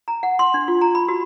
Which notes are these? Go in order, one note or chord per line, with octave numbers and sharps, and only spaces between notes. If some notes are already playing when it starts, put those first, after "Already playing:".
A#5
F#5
C6
D4
F4
A#5
B5
F#4